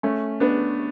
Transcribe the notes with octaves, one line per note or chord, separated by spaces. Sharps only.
A3 C#4
B3 D4